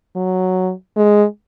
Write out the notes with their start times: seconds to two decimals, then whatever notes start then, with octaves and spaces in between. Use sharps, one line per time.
0.16 F#3
0.97 G#3